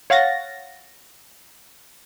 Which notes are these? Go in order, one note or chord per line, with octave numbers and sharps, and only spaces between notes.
C#5 F5 F#5 A6 A#6